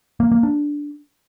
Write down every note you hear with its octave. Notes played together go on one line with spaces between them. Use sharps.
A#3
A#3
D4